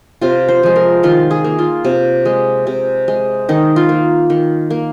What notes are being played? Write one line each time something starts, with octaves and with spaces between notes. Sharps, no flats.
C3 F4
C5
F3 G#3
A#4
D#3 F4
G#4
A#3
F4
C3
G#3
C3
G#3
D#3 D#4
F4
A#3
D#3
A#3